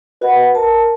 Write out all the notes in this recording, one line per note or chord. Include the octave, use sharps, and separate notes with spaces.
F#4 B4 D#5 F#5
A#4 A5